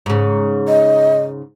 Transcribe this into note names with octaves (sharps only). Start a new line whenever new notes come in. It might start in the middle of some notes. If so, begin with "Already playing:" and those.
G#2 C#3
D#5